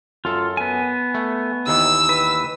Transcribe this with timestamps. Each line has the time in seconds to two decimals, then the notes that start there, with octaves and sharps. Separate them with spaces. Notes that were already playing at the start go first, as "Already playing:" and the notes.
0.25 F#2 F4 A4
0.57 B3 G#5
1.14 A3
1.67 D#2 D#3 E3 E6
2.09 B4